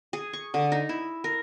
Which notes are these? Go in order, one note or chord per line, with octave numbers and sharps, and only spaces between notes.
G#4
C#6
D3
D#4
E4
A#4